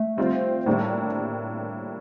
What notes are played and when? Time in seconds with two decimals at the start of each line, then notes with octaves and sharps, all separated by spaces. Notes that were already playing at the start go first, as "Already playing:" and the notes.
Already playing: A3
0.17 G3 C4 F4 C5
0.66 A2 G3 A#3 D4